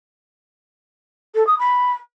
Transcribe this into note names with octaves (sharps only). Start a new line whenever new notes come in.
A4
D#6
B5